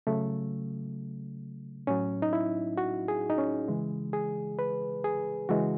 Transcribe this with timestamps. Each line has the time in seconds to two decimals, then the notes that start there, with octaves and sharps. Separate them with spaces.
0.07 C#3 F#3 A3
1.87 A2 F#3 C#4
2.22 D#4
2.33 E4
2.78 F#4
3.08 G#4
3.30 D#4
3.38 C#4
3.68 C#3 E3 G#3
4.13 G#4
4.59 B4
5.04 G#4
5.49 C#3 E3 G#3 F#4